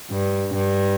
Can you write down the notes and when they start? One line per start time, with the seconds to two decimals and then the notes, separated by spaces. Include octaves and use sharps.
0.10 G2
0.55 G2